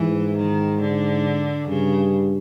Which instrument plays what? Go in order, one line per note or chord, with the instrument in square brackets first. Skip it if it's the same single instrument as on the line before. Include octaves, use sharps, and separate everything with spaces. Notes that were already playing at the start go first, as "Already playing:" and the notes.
Already playing: [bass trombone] G#2 [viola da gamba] E3
[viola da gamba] D#3
D3
[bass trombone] G2 [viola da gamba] C#3